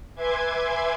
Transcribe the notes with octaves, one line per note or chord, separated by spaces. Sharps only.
B4 E5 G#5 C6 D6 G#6